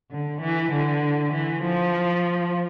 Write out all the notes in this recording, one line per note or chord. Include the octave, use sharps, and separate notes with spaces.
D3
E3
D3
E3
F3